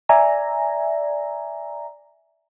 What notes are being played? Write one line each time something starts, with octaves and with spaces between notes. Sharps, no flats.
D5 E5 G#5 A#5